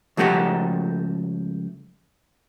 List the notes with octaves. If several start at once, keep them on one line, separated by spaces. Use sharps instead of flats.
C#2 F3 A3 F#4 G4 A4